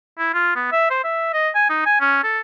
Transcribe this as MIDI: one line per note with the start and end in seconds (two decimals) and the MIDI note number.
0.19 0.31 64
0.34 0.54 65
0.56 0.69 59
0.72 0.90 76
0.90 1.02 72
1.04 1.31 76
1.34 1.50 75
1.55 1.66 80
1.70 1.82 63
1.86 1.97 80
2.01 2.19 61
2.24 2.40 69